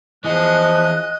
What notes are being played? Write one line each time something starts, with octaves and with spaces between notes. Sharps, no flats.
E3 F3 G#4 D#5 F#6